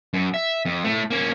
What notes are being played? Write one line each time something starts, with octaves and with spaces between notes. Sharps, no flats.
F#2
E5
F2
A2 A3
A#3 C#4